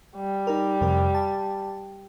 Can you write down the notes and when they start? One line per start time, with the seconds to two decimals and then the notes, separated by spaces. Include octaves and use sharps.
0.16 G3
0.47 D#4 A#4
0.81 F2 C3 A#4
1.15 A5